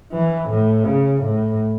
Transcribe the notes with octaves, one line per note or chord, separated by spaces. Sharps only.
E3
A2
C#3
A2